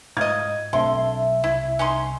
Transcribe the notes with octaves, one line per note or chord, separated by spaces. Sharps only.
G#2 F4 D#5 G#6
B1 D3 C4 E5 A5 C6
C2 E4
C#4 D#4 C6